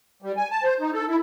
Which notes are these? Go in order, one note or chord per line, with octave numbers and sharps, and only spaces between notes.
G3
G#5
A5
C5
D#4
A4
E4